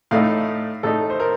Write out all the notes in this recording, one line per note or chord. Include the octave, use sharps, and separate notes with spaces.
A2 A3 D#4 F5
A2 A3 D#4 A4
C5
A#4